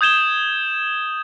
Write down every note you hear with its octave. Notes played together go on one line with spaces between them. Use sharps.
D#6 G6 G#6 E7 G7